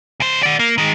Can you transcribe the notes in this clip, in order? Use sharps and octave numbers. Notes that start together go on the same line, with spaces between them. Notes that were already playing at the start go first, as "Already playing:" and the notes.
C#2 C5
F#4 D5
A#3
D#3 G#3